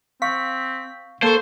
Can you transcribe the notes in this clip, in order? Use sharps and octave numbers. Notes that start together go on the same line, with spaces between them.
C4 F5 C#6 B6
A#3 A4 C5 A5 C#6